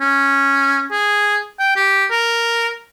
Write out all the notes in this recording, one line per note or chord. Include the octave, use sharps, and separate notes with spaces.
C#4
G#4
G5
G4
A#4